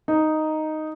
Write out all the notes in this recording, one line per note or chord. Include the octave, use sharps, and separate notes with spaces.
D#4